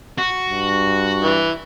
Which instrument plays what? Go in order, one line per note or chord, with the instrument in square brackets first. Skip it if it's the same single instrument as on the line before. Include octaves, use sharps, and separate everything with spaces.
[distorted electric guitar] F#4
[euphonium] G2
[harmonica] E3